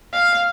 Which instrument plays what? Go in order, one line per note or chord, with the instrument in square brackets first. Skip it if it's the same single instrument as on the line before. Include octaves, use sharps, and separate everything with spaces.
[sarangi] F5